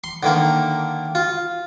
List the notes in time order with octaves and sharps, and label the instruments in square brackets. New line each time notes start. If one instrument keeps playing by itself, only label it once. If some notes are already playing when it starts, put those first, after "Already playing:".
[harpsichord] C6
D3 D#3 A#3
F4